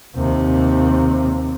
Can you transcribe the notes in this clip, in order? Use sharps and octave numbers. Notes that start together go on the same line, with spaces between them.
D#2 C3